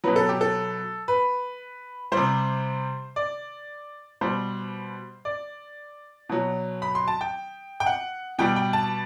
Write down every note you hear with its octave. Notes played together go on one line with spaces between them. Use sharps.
B2 F#3 B4
A4
G4
A4
B4
G3 C5
C3
D5
B2 G3 C5
D5
B2 F#3
B5
C6
A5
G5
G5
F#5
B2 G3 G5
G5
A5